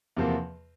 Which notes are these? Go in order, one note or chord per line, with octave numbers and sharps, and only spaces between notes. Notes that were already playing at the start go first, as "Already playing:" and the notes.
E2 C3 F3 A#3